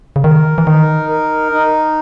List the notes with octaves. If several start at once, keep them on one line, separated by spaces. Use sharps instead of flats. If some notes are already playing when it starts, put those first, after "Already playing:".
C#3
D#3 A#4
E3
D#3 D#4
A#4
D#4